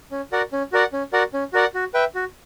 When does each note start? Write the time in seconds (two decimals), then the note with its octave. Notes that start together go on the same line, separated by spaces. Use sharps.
0.11 C#4
0.32 F#4 A#4 D5 F#5
0.53 C#4
0.72 F#4 A#4 D5 F#5
0.93 C#4
1.13 F#4 A#4 D5 F#5
1.34 C#4
1.53 F#4 A#4 D5 F#5
1.74 F#4
1.94 B4 E5 G5
2.15 F#4